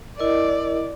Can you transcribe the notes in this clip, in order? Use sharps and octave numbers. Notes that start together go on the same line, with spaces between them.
E4 A#4 D5 D#5